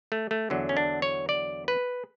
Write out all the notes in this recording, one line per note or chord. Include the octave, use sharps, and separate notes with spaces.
A3
A3
E2 D3 F#3
C#4
D4
C#5
D5
B4